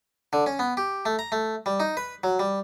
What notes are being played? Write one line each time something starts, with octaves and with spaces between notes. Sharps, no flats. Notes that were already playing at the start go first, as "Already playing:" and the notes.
D3
C#4
B3
G4
A3
A#5
A3
G3
D#4
B4
F#3
G3